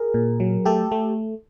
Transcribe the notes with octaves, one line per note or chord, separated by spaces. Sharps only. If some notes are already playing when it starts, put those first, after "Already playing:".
Already playing: G#4 A#4
A#2
F#3
A3 G4 A4
A3